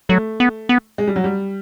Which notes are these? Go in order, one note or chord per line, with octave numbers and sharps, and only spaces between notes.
F#3 A3
B3
B3
G#3
G3
F#3
G3